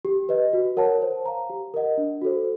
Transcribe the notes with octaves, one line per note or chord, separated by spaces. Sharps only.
G4
B4 D#5
F#4
A#4 C#5 F#5 A5
C5
F5 A#5
G4
A#4 D#5 F#5
D4
F#4 A4 C5